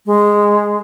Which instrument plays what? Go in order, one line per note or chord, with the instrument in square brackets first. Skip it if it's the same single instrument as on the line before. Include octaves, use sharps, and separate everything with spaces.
[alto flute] G#3